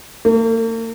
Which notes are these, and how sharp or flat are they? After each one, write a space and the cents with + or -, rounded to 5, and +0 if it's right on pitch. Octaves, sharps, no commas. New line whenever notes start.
A#3 -45